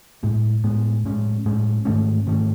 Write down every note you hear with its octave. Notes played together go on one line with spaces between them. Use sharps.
A2 G#3 B3
A2 G#3 B3
A2 G#3 C#4
A2 G#3 C#4
G#2 D#3 A3 C#4
G#2 D#3 A3 C#4